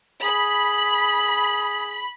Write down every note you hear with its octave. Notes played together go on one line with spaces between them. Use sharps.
G#4 B5